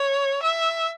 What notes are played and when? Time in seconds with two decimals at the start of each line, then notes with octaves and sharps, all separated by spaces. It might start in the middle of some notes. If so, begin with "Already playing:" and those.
Already playing: C#5
0.43 E5